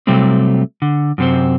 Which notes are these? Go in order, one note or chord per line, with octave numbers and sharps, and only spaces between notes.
C3 F#3 G3 A3 C4
D3
F#2 C3 C4